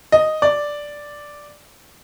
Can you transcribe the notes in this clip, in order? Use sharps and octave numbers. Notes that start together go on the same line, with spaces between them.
D#5
D5